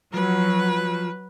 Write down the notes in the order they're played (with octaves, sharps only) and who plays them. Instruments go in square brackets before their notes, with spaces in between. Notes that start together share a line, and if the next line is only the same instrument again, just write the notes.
[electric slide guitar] F3 [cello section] F#3 [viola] B4